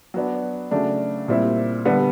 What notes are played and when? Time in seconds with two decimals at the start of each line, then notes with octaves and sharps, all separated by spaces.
0.14 F#3 B3 D4
0.71 C#3 F#3 A3 D4
1.28 A#2 G3 C4 E4
1.85 D3 G3 B3